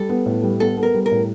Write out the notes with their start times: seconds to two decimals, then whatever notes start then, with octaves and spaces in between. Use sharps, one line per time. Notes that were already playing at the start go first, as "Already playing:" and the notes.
Already playing: G3 A4
0.09 B3
0.26 A2
0.43 G3
0.60 B3 A4
0.77 B3
0.83 A#4
0.94 G3
1.06 A#4
1.12 A2